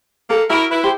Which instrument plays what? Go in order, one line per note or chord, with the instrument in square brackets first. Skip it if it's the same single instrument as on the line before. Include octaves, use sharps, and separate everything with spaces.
[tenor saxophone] A#3 [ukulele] A4
[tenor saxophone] E4 [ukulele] F#4 B5 [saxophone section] A#4
[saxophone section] E4 [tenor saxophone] B4
[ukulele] G4 [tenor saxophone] C5